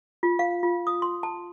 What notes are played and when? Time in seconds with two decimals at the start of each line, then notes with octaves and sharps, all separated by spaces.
0.23 F4
0.39 F5
0.63 F4
0.87 D#6
1.02 C6
1.23 A5